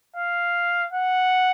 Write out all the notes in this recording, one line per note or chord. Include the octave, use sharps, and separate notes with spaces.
F5
F#5